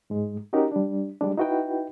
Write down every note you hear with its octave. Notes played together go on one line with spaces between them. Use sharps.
G#2 G#3
C#4 D#4 F#4 G4 A#4
G3 D4
G3 G#3 D4
D#4 E4 F#4 B4 G5